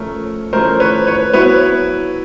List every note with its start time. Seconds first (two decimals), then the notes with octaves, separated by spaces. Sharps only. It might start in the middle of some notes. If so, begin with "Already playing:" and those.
Already playing: F3 A3 C#4 A#4
0.53 F3 A3 C#4 A#4 C5
0.80 B4 C#5
1.07 B4 C#5
1.33 F#3 B3 E4 B4 C#5